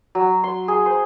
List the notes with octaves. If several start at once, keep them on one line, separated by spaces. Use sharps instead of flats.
F#3
C6
G#4
C5